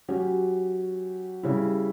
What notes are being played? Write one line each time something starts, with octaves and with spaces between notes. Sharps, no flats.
F#3 C#4 G4
C#3 G3 C#4 E4